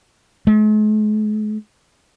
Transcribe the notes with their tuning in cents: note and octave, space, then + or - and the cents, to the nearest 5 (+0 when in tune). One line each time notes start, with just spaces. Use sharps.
G#3 +45